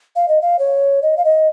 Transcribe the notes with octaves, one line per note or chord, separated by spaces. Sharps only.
F5
D#5
F5
C#5
D#5
F5
D#5